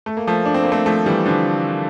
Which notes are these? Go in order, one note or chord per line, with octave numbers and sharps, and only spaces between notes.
A3
A#3
F3 A3
D4
C4
A#3
A3 C4
F3 A3
E3 G3
D3 F3